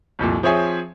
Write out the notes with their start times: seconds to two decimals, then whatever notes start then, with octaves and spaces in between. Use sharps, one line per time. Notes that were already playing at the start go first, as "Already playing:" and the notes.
0.19 C2 F2 A#2
0.43 F3 C4 G#4 C#5 E5 G#5